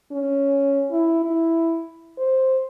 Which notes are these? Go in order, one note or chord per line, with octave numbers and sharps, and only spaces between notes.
C#4
E4
E4
C5